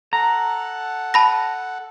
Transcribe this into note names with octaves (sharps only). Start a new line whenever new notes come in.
A4 F#5 A#5
A5 B5 A#6